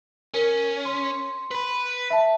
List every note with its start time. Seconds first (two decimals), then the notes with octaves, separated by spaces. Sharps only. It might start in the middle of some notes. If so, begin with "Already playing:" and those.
0.34 C#4 A#4
0.85 C6
1.51 B4 B5
2.10 E5 A5